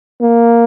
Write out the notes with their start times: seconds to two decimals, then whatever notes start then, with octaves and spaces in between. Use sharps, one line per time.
0.22 A#3